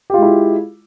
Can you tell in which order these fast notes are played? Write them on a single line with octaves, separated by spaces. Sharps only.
G4 F4 G#3 E4